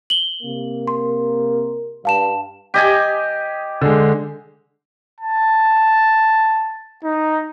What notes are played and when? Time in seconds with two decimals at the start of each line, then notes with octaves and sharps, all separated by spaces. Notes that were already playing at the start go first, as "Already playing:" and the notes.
0.10 F#7 G7
0.43 C3 A#3 A#4
0.88 C6
2.05 G2 F5 A5 E7
2.74 G4 D#5 G#5
3.81 D3 G#3
5.20 A5
7.04 D#4